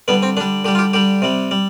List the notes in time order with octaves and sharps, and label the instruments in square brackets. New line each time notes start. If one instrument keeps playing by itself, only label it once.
[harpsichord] D3 G3 B3
C4
D3 G3 D4
D3 G3 G4
F4
G4
D3 G3 G4
C3 G3
G3